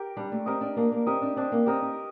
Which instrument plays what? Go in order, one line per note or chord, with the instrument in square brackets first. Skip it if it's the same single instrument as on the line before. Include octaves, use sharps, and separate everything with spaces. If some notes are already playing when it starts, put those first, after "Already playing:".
Already playing: [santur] G4 A#4
[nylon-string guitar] G3 [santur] D4
[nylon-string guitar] A3
[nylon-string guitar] C4 [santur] G4 A#4 D#5
[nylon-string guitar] D4
[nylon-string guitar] A#3 [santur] D4
[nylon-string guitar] A#3
[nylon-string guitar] C4 [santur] G4 A#4 D#5
[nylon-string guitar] D4
[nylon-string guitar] C4 [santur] D4
[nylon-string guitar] A#3
[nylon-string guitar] C4 [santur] G4 A#4 D#5
[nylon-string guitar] D#4